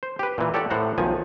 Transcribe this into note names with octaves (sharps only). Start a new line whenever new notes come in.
C5
G4 B4
A#2 E3
G4 A4 C#5 D5 F#5
A2 C5 F#5 A#5
B1 D#3 F3 G#5